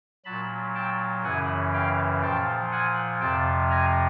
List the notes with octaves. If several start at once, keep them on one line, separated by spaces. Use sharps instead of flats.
A#2 F#3 A5 B5
G5 A5
F#2 C#3 E3 F#5 G#5
F5 G5
A#2 F3 G5 A5
F#5 G#5
F2 C3 F3 G5 A5
G#5 A#5